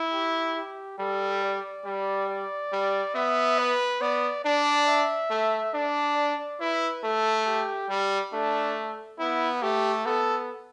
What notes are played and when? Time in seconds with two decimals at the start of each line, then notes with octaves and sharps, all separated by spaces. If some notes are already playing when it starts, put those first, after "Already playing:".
Already playing: E4
0.12 G4
0.57 G4
0.99 G3 A4
1.43 D5
1.85 G3
2.29 D5
2.72 G3
3.15 B3 E5
3.59 B4
4.01 B3 D5
4.45 D4 D5
4.87 E5
5.30 A3
5.74 D4 D5
6.17 D5
6.60 E4 B4
7.03 A3 A4
7.47 G4
7.89 G3
8.33 A3 D4
9.19 B3 E4
9.62 A3 G4
10.06 B3 A4